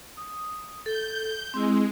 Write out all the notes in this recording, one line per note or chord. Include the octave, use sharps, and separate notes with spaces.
D#6
A4 G6
G#3 C4 E4